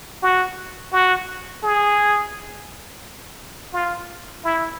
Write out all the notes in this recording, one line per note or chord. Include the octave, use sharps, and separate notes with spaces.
F#4
F#4
G#4
F4
E4